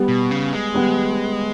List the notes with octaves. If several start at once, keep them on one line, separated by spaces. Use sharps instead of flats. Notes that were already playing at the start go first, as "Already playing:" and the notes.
Already playing: G3 B3 G4
B2
C#3
G#3
G3 B3 G4